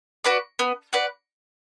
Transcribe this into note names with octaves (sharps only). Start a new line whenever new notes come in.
F#4 B4 D5
B3
F#4 B4 D5